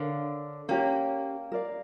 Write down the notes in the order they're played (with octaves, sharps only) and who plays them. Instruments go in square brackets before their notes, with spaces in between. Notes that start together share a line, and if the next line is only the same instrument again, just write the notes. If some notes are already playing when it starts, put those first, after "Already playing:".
Already playing: [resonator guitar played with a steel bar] D3 [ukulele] A#4 C#5 F5
[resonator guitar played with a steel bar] A#3 [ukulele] C#4 G4 C#5
[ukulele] A#4 D5 F5